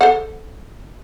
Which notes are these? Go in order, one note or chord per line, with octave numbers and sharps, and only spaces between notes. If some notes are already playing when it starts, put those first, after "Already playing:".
A4 C5 F#5